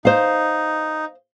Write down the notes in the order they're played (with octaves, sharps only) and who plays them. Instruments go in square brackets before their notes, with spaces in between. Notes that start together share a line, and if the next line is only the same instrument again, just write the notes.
[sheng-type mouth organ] D#4 [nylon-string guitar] C5 F5